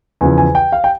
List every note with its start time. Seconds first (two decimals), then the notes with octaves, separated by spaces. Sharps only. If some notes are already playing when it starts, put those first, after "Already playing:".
0.21 E2 C#3 F3 G#5
0.38 G#5
0.55 G5
0.72 F5
0.84 G5